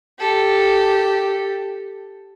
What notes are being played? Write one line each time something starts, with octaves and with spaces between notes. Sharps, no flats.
G4 A4